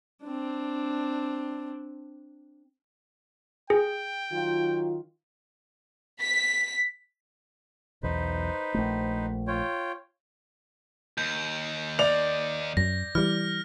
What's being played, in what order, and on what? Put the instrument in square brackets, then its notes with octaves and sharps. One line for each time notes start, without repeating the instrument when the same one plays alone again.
[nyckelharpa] C4 D4
[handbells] G#4 [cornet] G5
[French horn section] D#3 F#3 F4
[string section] B6
[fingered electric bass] B1 E2 [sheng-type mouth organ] D#4 B4 C5
[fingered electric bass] A#1 A3
[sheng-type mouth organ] F4 C#5 G5
[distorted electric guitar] D#2 [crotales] G6
[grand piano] D5 F7
[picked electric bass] F#2 [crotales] A#6
[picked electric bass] E3 G3 [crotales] F6